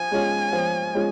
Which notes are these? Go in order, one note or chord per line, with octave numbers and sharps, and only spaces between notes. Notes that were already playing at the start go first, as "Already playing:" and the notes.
Already playing: F3 G#5
G#3 C#4 F4
F3
G#3 C#4 F4